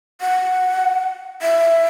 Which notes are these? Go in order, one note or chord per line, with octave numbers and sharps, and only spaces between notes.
F#5
E5